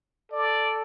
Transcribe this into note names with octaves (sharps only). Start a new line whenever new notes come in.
A4 D5